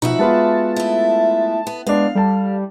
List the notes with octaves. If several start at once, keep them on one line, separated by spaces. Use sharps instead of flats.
B2 F3 D#4 F#4 B4 E5
G#3 B3 F4 A5
A3 E4
B3
G#3 B3 D4 F5
G3 A4 A5